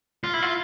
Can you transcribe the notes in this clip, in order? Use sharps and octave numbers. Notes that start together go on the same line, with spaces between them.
F4
E4
F4